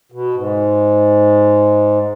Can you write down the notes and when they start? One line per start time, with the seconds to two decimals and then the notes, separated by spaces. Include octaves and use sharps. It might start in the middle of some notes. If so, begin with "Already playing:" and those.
0.12 B2
0.34 G#2